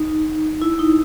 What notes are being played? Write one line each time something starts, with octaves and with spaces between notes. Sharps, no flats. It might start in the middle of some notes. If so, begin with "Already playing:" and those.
Already playing: D#4
E4
D#4